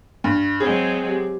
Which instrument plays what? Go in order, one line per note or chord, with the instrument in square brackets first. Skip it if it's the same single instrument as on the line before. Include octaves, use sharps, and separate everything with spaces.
[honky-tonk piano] G2
[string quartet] F#3 G#3 C4 [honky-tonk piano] G#4
[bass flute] G4